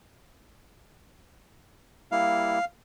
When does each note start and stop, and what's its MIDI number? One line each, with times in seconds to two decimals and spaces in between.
2.12 2.59 55
2.12 2.59 58
2.12 2.59 64
2.12 2.65 77